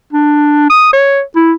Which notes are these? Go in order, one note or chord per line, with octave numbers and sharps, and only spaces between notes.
D4
D#6
C#5
E4